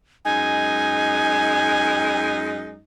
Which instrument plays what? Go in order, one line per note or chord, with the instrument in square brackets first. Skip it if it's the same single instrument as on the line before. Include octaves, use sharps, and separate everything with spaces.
[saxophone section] F#2 G#3 D#4 [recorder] G#5